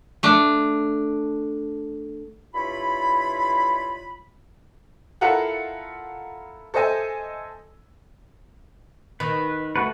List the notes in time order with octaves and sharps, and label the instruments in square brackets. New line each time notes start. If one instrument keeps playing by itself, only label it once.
[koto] A3 D4
[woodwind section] G2 E4 F4 C#5 B5
[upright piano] E4 F4 A4 A#4 F#5
A4 C5 D#5 E5 G#5
[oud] D#3 [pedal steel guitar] B4
[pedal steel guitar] A3 F#4 B4